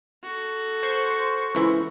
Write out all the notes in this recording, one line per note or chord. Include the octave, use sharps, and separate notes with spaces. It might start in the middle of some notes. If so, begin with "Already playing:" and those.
F#4 A4
C5 C#6
C#2 E3 E4